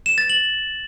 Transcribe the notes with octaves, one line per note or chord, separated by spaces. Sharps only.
E7
A6
F#7